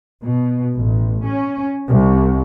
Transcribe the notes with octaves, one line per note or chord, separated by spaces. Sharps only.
B2
A1
C#4
C2